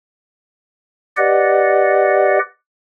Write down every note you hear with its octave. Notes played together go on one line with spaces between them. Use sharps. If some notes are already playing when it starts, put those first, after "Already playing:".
G4 B4 D5 D#5 F#5